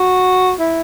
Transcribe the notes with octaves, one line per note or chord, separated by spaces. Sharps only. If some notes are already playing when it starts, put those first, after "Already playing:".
Already playing: F#4
E4